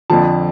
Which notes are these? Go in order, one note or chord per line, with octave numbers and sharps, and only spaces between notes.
F2 D3 F3 A5